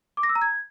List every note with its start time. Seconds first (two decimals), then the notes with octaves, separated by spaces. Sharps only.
0.17 D6
0.23 A#6
0.29 E6
0.35 A#5
0.42 G#6